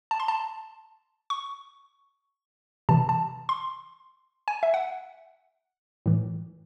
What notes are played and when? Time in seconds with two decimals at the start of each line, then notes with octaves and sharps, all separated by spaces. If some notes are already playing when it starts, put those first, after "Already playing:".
0.11 A5
0.20 C6
0.28 A5
1.30 C#6
2.89 C3 E3 A5
3.09 A5
3.49 C6
4.48 G#5
4.63 E5
4.74 F#5
6.06 A2 E3